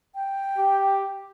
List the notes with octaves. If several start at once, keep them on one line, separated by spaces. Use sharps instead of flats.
G5
G4